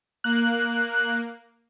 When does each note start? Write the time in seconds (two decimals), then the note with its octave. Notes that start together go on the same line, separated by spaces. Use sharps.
0.24 A#3 F#6